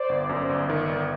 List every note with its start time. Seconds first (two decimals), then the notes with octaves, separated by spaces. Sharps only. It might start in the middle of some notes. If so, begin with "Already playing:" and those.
Already playing: C5 D5
0.09 G1
0.29 F#2
0.49 G1
0.69 D#3 D5 E5
0.89 G1